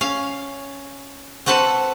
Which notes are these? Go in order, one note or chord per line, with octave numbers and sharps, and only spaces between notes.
C#4 F5
C4 F#4 A4 B4 A5